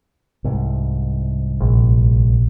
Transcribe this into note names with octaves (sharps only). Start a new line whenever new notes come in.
C2 G#2
A#1